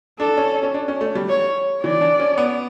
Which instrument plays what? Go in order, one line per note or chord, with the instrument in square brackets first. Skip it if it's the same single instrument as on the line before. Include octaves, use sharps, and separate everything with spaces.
[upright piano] D4 [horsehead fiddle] A4
[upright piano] C#4
C#4
D4
C#4
A3
G3
[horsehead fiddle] C#5
[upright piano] E3 [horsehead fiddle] D5
[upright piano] D4
C#4
B3